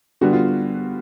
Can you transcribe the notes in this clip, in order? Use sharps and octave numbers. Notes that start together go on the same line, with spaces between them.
D3 G3 B3 D4 F#4
F4